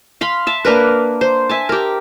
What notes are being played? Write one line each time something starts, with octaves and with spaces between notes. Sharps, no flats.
F5 B5 C6
E5 A5
A#3 D4 A#4 B4
C5
E5 G#5 A5
G4 A#4